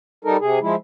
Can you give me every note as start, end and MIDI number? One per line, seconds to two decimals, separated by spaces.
0.25 0.37 55
0.25 0.37 63
0.25 0.37 69
0.25 0.37 70
0.40 0.59 48
0.40 0.59 68
0.61 0.76 53
0.61 0.76 56
0.61 0.76 64